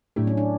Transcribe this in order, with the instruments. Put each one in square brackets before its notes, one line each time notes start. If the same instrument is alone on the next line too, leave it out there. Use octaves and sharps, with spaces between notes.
[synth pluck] A2 F#3 A3 E4 G4 [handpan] D4
[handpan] C#4
D4